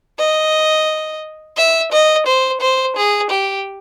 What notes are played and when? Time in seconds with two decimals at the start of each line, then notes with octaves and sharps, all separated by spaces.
0.19 D#5
1.57 E5
1.92 D#5
2.27 C5
2.61 C5
2.97 G#4
3.31 G4